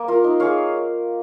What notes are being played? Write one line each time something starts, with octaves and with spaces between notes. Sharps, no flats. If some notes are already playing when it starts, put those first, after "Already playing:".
Already playing: A#3
F4 A#4
D#4
G#4 C#5 F5